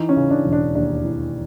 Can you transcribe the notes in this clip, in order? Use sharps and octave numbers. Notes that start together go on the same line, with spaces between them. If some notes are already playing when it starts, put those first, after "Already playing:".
Already playing: E3 D#4
C#4
C#3
D4
E1
D4
D#2 D4
E3